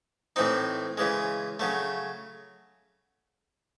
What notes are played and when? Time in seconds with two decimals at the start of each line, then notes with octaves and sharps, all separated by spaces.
0.36 A2 E3 C4 D#4
0.98 C#3 E3 G#3
1.60 C#3 F#3 A3